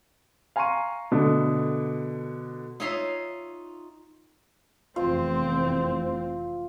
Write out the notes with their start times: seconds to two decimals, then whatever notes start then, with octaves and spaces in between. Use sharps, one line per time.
0.56 F5 G#5 A#5 C6 C#6 D#7
1.11 B2 D3 A3
2.80 D#4 F4 C#5 E5 A#5 C6
4.96 F1 E2 C4 F4 C5